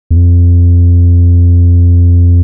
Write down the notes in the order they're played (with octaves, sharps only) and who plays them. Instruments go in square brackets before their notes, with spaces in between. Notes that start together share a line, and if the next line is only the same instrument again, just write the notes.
[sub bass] E2
F2